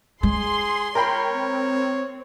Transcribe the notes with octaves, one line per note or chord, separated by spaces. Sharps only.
G#3 G#4 C6
A#4 C#5 G5 B5
C4